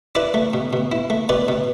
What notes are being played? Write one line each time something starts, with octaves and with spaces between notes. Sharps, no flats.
E4 B4 D5
A3
B2
B2
E4
A3
B2 B4 D5
B2